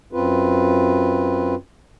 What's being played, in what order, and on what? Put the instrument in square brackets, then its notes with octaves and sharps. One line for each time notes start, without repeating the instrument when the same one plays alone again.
[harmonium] F#2 C4 F4 B4